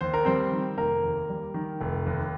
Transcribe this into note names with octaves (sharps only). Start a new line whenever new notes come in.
D#2 C5
A#4
G3 C4 C5
D#3
F1 A#3 A#4
D#2
G3
D#3
F1
D#2